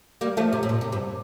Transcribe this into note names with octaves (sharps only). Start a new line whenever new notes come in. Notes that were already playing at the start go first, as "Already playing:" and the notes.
G3 A#3
F3 A3
C3
A2
A#2
C3
G2